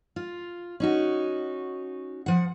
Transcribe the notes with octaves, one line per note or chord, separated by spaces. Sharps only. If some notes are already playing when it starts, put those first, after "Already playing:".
F4
C#4 D#4 F#4
F3 F#5